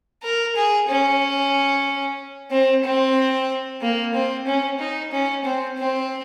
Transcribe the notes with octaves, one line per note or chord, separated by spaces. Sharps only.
A#4
G#4
C#4
C4
C4
A#3
C4
C#4
D#4
C#4
C4
C4